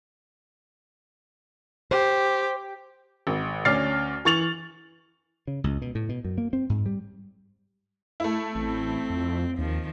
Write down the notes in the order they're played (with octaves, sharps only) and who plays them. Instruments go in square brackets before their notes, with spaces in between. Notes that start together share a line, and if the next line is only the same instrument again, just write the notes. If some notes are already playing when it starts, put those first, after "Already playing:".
[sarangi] G4 [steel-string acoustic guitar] C5
[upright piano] G#1
D2 C#4 D5 F6 A6 C7
E3 C#6 A6 F7 F#7
[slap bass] C#3
C#2
B2
A2
B2
F#2
A#3
C4
G#2
G3
[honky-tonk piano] A3 E4
[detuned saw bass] A1 [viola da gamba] C4
[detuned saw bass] F2
[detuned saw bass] D#2 [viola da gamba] D#3 F3